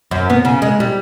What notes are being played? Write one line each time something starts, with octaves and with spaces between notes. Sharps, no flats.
F#2
B3
C#3
G#3
G3